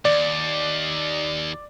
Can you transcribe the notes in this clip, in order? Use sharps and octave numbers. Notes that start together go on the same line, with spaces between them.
D#2 D5